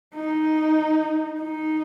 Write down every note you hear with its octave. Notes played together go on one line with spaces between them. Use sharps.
D#4
D#4